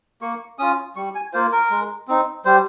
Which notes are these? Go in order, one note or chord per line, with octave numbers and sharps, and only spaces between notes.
A#3 C#6
C#4 F4 D#6
G3 C#6
G#5
A#3 F4 C5
A#4
G#3
C4 D#4
G3 C5